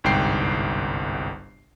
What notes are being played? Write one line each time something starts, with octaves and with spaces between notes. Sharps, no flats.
G1 C2 G#2 G5 C7